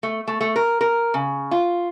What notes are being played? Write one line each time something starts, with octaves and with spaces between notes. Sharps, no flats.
A3
A3
A3
A#4
A#4
C#3
F4